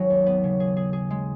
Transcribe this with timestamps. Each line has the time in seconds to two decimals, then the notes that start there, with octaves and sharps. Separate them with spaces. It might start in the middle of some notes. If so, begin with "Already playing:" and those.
Already playing: G#1 F#3 G#4
0.10 D#2
0.26 B3
0.44 C#3
0.60 G#4
0.77 G#4
0.93 G#4
1.10 G#3